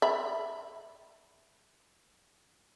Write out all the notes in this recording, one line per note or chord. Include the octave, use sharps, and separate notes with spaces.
E5 B5